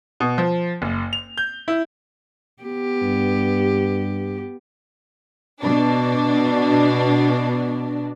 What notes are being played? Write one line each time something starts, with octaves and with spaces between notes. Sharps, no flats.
B2
F3
F#1
F7
G6
E4
B3 G4
G2
B2 D4